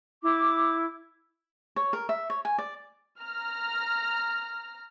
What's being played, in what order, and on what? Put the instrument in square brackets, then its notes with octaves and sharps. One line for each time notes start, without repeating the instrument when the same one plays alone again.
[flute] E4 [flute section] D6
[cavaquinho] C#5
A#4
E5
C#5
G#5
D5
[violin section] A#5 F6